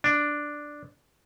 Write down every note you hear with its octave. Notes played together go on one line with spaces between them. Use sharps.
D4